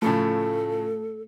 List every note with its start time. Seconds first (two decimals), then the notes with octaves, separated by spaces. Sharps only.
0.02 A2 C#3 F3 A3 A4